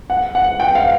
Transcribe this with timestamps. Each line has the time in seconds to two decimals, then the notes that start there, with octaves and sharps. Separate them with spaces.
0.10 F#5
0.35 F#5
0.60 G5
0.75 F5